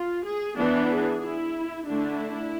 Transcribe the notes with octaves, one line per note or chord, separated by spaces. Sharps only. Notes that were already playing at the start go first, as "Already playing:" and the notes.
Already playing: F4
G#4
E3 B3 D4
G#4
E4
D3 A3 D4 E4